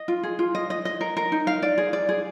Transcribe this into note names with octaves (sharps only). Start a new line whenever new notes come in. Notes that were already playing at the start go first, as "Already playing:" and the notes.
Already playing: D#5
F4
G#4
F4
D#5
D#5
D#5
A#4
A#4
D#4
F5
D5
G#4
D5
G#4